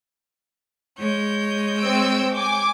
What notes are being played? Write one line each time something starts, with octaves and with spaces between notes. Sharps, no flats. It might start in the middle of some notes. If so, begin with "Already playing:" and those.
G#3 C#5 G6
C4 E6 D7
G#5 D6